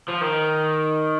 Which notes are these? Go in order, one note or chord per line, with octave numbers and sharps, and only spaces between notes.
F3
D#3